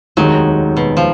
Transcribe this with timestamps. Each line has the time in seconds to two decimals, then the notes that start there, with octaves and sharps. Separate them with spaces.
0.17 F1 D#2 D#3 F#3 G#3 D#4
0.77 B2
0.97 F3